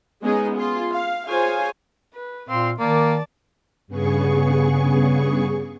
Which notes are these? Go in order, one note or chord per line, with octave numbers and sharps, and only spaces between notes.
G#3 B3 C#4 D#4 G#4
F4 G#4 C6
F5
F4 G#4 C5 C#5 F5 G#5
B4
A#2 C4 F5 C6
D#3 A#3 D5 A5
G2 C#3 B3 G#4 C#6